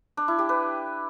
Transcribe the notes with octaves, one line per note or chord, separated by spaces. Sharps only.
D4
E4
G4
B4